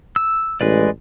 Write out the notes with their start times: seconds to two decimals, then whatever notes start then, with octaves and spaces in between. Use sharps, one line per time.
0.16 E6
0.61 A1 G#3 B4 D5